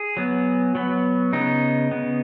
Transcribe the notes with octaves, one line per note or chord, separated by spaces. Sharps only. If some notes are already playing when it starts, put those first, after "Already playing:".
Already playing: G#4
F#3 B3
F#3 B3
C#3 B3 D#4
C#3 B3